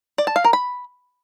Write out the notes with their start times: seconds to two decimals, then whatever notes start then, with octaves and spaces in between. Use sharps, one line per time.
0.18 D5
0.27 A5
0.36 F5
0.44 A#4
0.53 B5